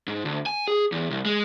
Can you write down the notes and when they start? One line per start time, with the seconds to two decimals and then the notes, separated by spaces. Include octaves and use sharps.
0.08 G#2
0.25 D2
0.46 G#5
0.68 G#4
0.92 E2
1.10 C2
1.26 G#3